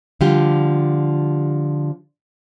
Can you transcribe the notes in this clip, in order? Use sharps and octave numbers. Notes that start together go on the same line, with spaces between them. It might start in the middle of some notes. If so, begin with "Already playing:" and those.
D3 F3 G3 F4 G4